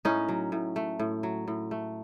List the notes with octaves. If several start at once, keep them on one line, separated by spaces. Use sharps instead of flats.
A2 C#4 D#4
F#3
A2
A3
A2
F#3
A2
A3